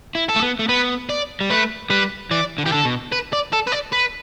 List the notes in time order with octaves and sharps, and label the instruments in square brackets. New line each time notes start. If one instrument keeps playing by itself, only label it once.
[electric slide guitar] E4
[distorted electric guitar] A4
[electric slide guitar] A3
B3
A3
[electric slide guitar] B3 [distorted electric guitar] B4
[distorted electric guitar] D5
[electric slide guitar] G3
[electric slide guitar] A3 [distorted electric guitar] B4
[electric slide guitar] G3 [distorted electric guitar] B4
[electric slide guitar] E3 [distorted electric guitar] D5
[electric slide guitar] D3
[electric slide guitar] E3 [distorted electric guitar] G4
[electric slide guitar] D3 [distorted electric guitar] A4
[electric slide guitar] B2
[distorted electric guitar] B4
D5
A4
B4
D5
B4